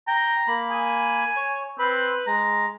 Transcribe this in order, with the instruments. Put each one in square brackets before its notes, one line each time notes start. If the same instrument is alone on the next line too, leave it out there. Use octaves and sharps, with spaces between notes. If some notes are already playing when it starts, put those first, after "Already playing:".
[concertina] G5 [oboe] A#5
[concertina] A#3 B5
[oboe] G#5
[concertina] C#5
[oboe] C4 [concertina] B4 B5
[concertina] G#3 [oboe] A#5